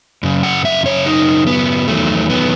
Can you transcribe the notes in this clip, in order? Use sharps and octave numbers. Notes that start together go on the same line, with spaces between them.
F#2 C#3
F#5
E5
C#5
D#4
B3
E2 D#3 F#3 A3
B3